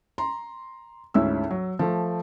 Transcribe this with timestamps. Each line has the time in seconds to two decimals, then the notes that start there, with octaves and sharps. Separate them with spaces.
0.18 A#5 C6
1.14 D2 G#2 C#4 E4 E6
1.51 F#3
1.79 F3 A3